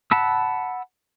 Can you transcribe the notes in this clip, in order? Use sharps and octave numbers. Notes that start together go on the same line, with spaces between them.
F#5 A5 B5 E6